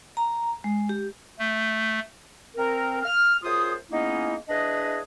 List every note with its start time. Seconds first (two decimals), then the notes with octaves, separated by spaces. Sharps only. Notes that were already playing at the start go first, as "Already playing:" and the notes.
0.17 A#5
0.64 G#3
0.89 G4
1.39 A3
2.57 C4 A#4
3.03 F6
3.43 F#2 F4 G#4 C5 D#6
3.91 G#3 A#3 B3 C#4 D#4 E4
4.49 E2 D4 G#4 B4 D#5